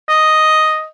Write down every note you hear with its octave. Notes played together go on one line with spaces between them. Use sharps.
D#5